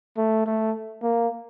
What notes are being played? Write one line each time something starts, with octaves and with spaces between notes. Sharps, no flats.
A3
A3
A#3